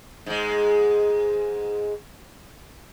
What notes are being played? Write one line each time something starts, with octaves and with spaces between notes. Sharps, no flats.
G#2 G#3